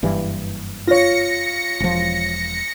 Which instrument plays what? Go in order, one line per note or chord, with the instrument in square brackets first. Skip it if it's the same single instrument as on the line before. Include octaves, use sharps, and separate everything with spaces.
[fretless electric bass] F#1 G2 E3
[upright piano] F4 C#5 [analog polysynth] A#6 C#7
[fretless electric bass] E1 F3